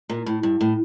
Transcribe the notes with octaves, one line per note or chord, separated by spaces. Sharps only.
A#2
A2
G2
A2